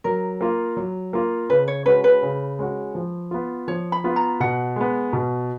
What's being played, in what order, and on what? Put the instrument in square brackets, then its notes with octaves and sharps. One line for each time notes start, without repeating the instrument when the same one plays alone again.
[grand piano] F#3 [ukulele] A#4
[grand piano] A#3 F4
F#3
A#3 F4
[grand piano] C#3 [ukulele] B4
[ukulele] C#5
[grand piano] G#3 C#4 F#4 [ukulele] B4
[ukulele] B4
[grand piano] C#3
G#3 C#4 F#4
F3
B3 F4
[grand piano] F3 [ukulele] C#5
[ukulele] B5
[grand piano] B3 F4
[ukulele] A#5
[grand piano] B2 [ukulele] F#5
[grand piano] G#3 B3
B2